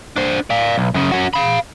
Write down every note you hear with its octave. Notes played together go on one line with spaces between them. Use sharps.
D4 C5
D5 F5
B1
F#2 C#3
C#4 F#4
F5 B5